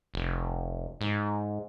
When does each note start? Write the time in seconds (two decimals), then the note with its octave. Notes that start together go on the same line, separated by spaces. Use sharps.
0.14 F1
1.01 G#2